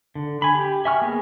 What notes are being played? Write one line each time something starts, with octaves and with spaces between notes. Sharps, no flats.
D3
G#5 B5
G4
E5 G#5 C#6 F6
A#3 B3 G#4